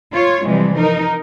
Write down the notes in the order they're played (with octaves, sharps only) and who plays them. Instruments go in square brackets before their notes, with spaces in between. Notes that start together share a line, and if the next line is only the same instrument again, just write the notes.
[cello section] F4 C#5
C3 E3 F3 G3 G#3
D#4 A#4